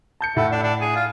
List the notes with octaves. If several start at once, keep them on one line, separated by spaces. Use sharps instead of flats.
A5 G6 C#7
A2 A3 F#5 B5
D4
D4
G#4
F4